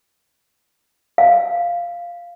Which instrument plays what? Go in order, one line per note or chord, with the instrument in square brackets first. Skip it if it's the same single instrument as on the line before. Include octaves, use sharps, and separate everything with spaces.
[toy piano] F5